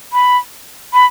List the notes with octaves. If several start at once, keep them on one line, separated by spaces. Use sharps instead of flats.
B5
B5